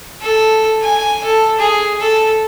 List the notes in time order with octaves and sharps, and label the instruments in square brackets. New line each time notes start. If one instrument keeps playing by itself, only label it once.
[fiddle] A4
G#5
A4
G#4
A4